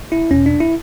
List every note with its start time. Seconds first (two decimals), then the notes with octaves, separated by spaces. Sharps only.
0.12 E4
0.31 E2 B2 C#4
0.46 D4
0.60 E4